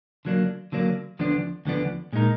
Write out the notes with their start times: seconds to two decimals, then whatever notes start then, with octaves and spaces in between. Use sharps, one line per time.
0.25 D3 F#3 A#3 D4
0.72 D3 F#3 A#3 D4
1.19 D2 D3 F3 B3 D4
1.65 D2 D3 F3 B3 D4
2.13 A#2 G#3 D#4 A#4